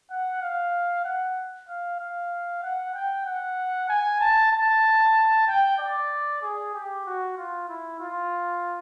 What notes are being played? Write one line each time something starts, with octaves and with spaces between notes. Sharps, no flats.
F#5
F5
F#5
F5
F5
F#5
G5
F#5
G#5
A5
A5
G5
D5
G#4
G4
F#4
F4
E4
F4